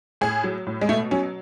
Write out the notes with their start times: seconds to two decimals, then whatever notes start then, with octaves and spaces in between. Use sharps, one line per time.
0.21 A2 G#4
0.44 F#3
0.67 A2
0.81 G#3
0.89 B2 A3
1.11 F#3 C#4